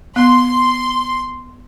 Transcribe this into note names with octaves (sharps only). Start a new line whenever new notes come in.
B3 C6